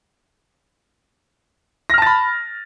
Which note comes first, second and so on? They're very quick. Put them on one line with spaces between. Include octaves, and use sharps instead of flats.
A#6 F6 A5 A6 B5